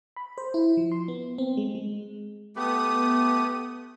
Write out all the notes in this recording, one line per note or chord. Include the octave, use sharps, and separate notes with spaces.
B5
C5
E4
F3
C6
B3
C4
G#3
G#3
A3 B3 G4 D#6